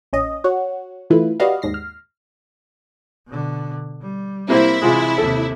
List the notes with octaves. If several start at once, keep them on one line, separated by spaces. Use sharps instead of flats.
A#1 C#4 D#5
F#4 C#5
E3 A3 E4 F4 B4
F#4 G4 B4 D5 D#5 F5
D#2 G#2 A#6 C7
F6
B2 D3
G3
C3 A#3 C4 E4
C3 E3 G#3 F4
D#2 C3 A4